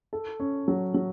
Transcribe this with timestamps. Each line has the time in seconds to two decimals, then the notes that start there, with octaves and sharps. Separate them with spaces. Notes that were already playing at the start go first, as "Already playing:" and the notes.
0.13 A4
0.40 C#4
0.68 F#3
0.94 F#3